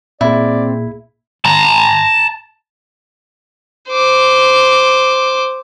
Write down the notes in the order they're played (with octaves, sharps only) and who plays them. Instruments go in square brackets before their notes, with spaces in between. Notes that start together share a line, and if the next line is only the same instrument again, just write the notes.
[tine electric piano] A#2 A#3 G#4 [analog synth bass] C4 [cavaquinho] E4 [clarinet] D5
[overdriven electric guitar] A5 A#5
[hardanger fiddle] C5 D6